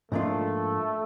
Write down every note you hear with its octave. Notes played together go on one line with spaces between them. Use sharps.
G#2 F3 A3 A#3 D4 F4